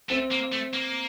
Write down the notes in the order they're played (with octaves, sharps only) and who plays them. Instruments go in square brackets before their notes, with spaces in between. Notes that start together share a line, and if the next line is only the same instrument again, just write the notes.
[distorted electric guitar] A3 [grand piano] C4
[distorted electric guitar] A#3
A3
A#3